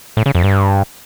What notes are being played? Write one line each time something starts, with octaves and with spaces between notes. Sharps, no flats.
A2
C#3
F2
G2